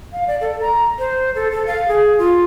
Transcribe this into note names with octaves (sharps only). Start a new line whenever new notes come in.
F5
D5
A4
A#5
C5
A4
A4
F5
G#4
F4